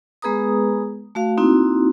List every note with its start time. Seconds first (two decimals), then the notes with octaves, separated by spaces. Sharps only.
0.22 G#3 B3 G#4 B4 A#5 D#6
1.15 A3 F#4 F5
1.38 A#3 C4 D#4 E4 F#4